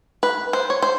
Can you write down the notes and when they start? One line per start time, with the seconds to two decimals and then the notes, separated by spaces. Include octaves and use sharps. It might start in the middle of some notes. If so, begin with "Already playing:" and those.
0.23 B4
0.53 C5
0.70 C#5
0.82 C5